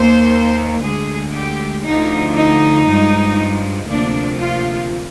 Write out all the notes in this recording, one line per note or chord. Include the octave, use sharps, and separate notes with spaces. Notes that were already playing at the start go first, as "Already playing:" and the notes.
Already playing: D#2 D#3 A#3 C5
D2 D3 G#3 G#4
G4
D2 D3 F3 D#4
D#4
G2 F3 G#3
D2 C3 F3 A#3 D4
F4